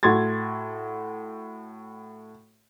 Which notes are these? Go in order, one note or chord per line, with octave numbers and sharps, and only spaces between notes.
A2 F#4 C6 G#6 A6